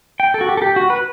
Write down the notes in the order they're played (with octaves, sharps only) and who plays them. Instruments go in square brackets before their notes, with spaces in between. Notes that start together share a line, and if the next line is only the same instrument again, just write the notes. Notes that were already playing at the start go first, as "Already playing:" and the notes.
[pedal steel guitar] G5
A4
F#4
G4
A4
G4
F#4
B4